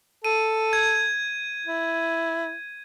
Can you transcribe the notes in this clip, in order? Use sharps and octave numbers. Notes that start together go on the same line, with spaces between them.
A4 D#7
G#6
E4